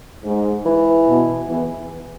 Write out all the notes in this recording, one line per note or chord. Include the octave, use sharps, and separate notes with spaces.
G#2
E3
B2
E2 E3